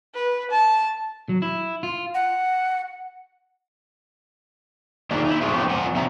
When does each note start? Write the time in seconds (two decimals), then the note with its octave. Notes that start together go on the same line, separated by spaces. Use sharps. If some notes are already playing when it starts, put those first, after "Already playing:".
0.15 B4
0.51 A5
1.29 F#3
1.42 E4
1.83 F4
2.14 F#5
5.11 D#3 A#3 D4 F4 G#4
5.24 D#4 E4
5.41 F3 F#3 G#3 A3 C#4 F4
5.54 G#2 F3 B3 C#4 G4
5.69 F2 D3 F3 F4 F#5 G#5
5.95 D3 C4 F#4 E5 A#5